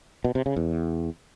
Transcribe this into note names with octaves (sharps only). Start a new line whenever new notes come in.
B2
C3
C#3
E2